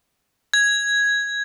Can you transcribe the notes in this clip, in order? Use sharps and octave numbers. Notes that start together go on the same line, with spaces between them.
G#6